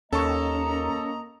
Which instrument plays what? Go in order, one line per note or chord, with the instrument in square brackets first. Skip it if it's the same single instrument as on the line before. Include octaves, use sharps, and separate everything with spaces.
[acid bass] D#2 [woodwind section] A#3 D#5 A#5 [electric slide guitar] C#4 [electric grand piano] A4 A5 C#6